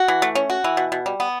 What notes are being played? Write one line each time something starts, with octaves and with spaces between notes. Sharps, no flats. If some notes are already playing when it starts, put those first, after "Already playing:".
Already playing: F#4
E3
A3
C#4
F#4
E3
B2
B2
G3
B3